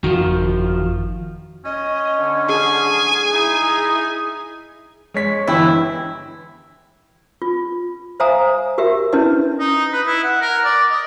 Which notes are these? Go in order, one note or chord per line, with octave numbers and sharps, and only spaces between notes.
G1 F2 D#3 F3 F#4
C#4 D#5
D3
G#4 G#5
D#4 E4
G#3 C#5 B6
G1 E3 E4 G5
F4
C5 E5 F5 G#5 A#5 D#6
F#4 G4 A#4 E5
C#4 D4 E4 B4 D#5
D#4
B4
E4
F#5
A#4
D5
D#5